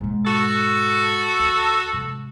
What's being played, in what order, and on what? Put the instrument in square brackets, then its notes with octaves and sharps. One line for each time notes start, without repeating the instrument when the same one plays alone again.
[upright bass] G#2 B2
[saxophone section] F#4 A4
[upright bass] D2
G#2 C3